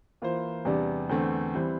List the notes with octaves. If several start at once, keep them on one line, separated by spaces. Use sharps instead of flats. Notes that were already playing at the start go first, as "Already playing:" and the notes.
E3 A#3 F4 C5
E2 C3 G3 D4
E2 D3 A3 C4
E3 G3 C4